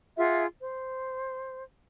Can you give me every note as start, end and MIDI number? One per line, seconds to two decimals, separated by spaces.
0.17 0.45 65
0.17 0.45 68
0.17 0.45 76
0.17 0.45 78
0.61 1.64 72